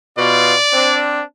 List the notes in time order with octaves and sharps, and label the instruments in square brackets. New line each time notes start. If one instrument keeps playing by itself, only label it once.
[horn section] B2 F4 [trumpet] D5
[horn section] C4 D4